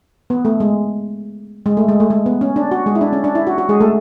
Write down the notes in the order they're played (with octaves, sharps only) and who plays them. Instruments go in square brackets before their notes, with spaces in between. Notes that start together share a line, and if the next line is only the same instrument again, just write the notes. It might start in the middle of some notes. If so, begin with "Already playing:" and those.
[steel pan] B3
A3
G#3
G#3
A3
G#3
A3
G#3
B3
C#4
D4
F#4
G#3 G#4
E4
D4
C#4
D4
E4
F#4
F#4
G#3 G#4
A3 A4